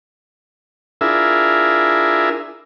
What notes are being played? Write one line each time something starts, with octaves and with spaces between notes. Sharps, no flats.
D4 E4 F4 G#4 A#4 E5